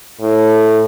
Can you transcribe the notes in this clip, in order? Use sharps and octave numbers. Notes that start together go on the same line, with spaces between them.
A2